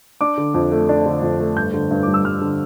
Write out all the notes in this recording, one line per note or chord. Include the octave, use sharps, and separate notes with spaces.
D4 D6
D3
F2
A3
D4
D3
F2
A3
G2 G6
D3
G2
G3 D6
E6
G2 F6
D3